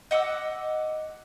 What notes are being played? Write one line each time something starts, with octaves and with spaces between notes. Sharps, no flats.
D#5 F#5 D6 E6